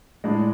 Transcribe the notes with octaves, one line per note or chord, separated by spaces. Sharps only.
A2 G#3 D4